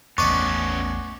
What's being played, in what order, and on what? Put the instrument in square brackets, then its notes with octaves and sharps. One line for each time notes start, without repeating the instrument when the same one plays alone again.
[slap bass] A1 E2 [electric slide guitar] B3 C#4 [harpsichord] D4 D5 D#5 [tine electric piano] C#6